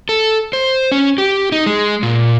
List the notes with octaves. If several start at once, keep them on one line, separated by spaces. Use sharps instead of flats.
A4
C5
C#4
G4
D#4
G#3
A#2